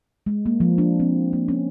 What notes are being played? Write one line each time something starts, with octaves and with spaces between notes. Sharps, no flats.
G#3
A#3
F3
D4
C4
A#3
C#4